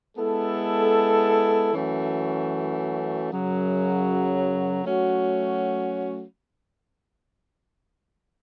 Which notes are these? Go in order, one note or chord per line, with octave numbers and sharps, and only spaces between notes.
G#3 B3 E4 A4
F#2 E3 A3 C#4 F#4
F#2 C#3 F#3
F#3 A3 C#4 F#4